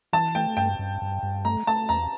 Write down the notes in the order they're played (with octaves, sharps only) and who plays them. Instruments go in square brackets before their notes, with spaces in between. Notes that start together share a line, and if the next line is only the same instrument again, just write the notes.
[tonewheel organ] E3 [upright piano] A5
[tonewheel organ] A3 [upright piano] G5
[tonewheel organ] G2 [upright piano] G5
[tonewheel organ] G2
G2
G2
[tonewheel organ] A3 [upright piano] A#5
[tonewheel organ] A3 [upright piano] A5
[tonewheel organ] E2 [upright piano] A#5